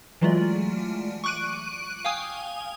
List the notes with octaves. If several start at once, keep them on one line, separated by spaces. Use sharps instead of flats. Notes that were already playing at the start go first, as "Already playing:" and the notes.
E3 F#3 G#3 A3 F4 D5
C#6 D6 F#6 D7 D#7
F5 G5 G#5 D#6